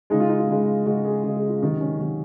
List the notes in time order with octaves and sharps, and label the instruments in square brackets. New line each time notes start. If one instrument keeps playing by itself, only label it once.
[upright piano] C#3 G#3 D#4
F4
D#4
F4
C#3 G#3
C#3 G#3 F#4
G#4
C#3 G#3 G#4
G#4
F4
C3 D#3 F#3 D#4
C#4
C3 D#3 F#3